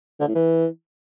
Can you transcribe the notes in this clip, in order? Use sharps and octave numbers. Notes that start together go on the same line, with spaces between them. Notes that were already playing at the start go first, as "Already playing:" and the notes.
D3
A2
E3